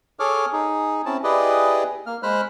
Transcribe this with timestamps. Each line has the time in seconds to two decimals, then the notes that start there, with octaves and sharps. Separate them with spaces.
0.20 G#4 A4 C#5 D6 F6
0.53 D#4 G#4
1.05 C4 C#4 E4 A5
1.24 E4 G4 G#4 B4 D5 D#5
2.06 A#3 F6
2.23 G#3 C5 B5 F6 F#6